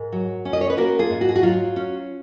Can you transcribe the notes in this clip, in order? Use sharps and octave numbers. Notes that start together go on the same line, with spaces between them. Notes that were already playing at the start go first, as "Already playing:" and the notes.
Already playing: G#2 A#4
F#3
C#4
D#5
C#5
B4
A#3 F#4 A#4
F4 G#4
G#2
F#4
G#4
F#4
F#3 F4
C#4